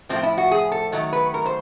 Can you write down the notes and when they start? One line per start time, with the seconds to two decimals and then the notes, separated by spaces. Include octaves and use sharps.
0.09 A2 F3 A3 C4
0.23 E4
0.38 F#4
0.51 G#4
0.72 A4
0.92 D#3 F#3 A3
1.12 B4
1.34 A#4
1.46 C5